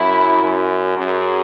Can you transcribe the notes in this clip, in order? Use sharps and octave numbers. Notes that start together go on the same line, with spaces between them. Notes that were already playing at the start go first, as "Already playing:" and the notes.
Already playing: F#2 E4
F#2
F#2 G#4